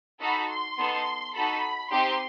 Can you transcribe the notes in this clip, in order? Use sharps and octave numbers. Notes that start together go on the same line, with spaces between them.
D#4 F#4 A4 B5
C6
B3 D#4 A4
D#4 F#4 A4 B5
C4 D#4 G4 C6